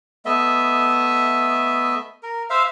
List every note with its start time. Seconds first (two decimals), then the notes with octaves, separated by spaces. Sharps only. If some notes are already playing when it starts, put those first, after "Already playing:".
0.25 A3 B3 D#5 E5
2.23 A#4
2.50 C5 E5 F5